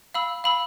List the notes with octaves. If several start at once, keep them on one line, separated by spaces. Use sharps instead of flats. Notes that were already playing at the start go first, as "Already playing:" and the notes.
F5 B5 E6
F5 B5 E6